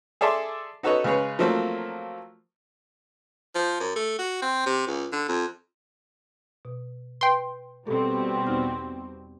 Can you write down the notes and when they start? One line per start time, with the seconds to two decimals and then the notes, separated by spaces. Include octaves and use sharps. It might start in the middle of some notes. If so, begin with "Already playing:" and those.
0.21 G#4 A4 D5 E5 A5 C6
0.83 D#4 F#4 A4 B4 C#5 D#5
1.04 C#3 G#3 G#4 B4 C#5
1.39 F3 F#3 A3 A#3 C4
3.55 F3
3.80 F#2
3.96 A3
4.19 F#4
4.42 C4
4.66 C3
4.87 C#2
5.12 D3
5.28 F2
6.65 B2
7.21 B4 G5 C6
7.87 B2 G3 C4 G4 A4
8.47 E2 D#4 F6